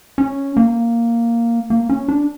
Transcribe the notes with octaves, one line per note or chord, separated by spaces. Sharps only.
C#4
A#3
A#3
C#4
D4